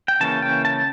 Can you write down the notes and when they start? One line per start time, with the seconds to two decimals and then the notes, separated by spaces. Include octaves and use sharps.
0.08 G5
0.20 C#3 E3 A#3 C#4 A5
0.42 G5
0.65 A5